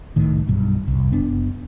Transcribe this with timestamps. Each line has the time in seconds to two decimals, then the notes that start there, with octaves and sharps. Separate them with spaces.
0.16 C2 A2 D#3
0.47 B1 G2
0.88 F1 C2
1.11 F#1 B3 C4 D4